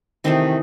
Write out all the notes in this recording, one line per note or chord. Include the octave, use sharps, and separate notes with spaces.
C3 D#3 E3 A3 C4 D#4